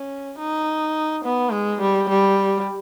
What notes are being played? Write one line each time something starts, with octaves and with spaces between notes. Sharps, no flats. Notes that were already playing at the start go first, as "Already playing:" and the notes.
Already playing: C#4
D#4
B3
G#3
G3
G3